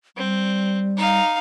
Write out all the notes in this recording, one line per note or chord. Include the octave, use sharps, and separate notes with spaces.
G3 C4
D#4 F5